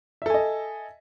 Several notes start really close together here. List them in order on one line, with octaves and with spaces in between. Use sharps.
E5 A4 G#5 D#5